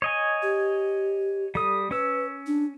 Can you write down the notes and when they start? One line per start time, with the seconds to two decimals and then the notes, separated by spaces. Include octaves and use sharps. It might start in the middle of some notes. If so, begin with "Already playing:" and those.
0.02 C#5 D#5 G#5
0.42 G4
1.55 G3 A4 D#6
1.91 C#4 B4 E6
2.46 D4